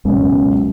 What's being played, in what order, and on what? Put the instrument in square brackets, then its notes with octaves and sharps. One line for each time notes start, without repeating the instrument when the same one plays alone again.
[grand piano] C#2 B2 G#3 C#4 [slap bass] F#2